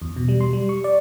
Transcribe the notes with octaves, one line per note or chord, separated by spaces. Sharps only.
E2
B2
G3
C6
G3
C#6
D5